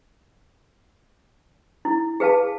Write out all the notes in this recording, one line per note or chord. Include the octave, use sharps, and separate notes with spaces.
E4
G#4 B4 F5 A5